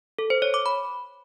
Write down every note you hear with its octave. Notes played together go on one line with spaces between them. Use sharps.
A4
C5
C#5
D6
B5